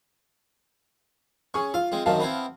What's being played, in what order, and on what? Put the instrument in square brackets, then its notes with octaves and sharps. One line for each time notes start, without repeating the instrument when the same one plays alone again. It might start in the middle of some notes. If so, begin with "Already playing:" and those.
[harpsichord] C#4 [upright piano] G#4 C#6
[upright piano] F4 [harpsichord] F5
[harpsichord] G#3 C4
[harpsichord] F#2 D#3 C4 [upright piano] F5 A5
[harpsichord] B3 C4 E4